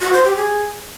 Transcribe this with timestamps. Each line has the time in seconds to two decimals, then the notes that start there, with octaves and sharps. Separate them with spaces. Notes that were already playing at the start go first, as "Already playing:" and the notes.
0.01 F#4
0.13 C5
0.24 G4
0.36 G#4